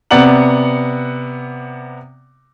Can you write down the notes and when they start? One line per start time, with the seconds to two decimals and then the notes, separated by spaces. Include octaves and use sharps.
0.11 C3 B3 D5 F#5 A#5 F#7